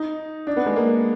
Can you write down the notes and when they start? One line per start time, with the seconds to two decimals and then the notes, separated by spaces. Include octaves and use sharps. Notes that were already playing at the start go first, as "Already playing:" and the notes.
Already playing: D#4
0.47 D4
0.57 B3
0.66 G#3
0.76 A#3